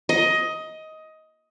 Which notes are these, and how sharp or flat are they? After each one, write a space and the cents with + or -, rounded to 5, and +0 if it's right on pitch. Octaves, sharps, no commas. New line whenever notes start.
D#5 +15